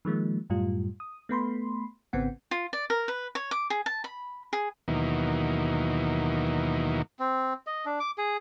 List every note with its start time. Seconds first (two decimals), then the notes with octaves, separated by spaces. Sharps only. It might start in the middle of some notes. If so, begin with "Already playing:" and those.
0.05 D#3 F3 G#3 A#3
0.50 F#2 A2 G3 F4
1.00 D#6
1.29 A3 B3 B5 C6
2.13 G#1 C#3 B3 C4 F#5
2.51 F4
2.73 D5
2.90 A#4
3.08 B4
3.35 C#5
3.51 D6
3.70 G#4
3.86 A5
4.04 B5
4.53 G#4
4.88 D#2 B2 D#3 E3 F#3 A#3
7.19 C4
7.67 D#5
7.85 D4
8.00 D6
8.18 G#4